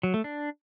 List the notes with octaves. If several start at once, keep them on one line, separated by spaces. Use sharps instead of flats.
F#3
A3
D4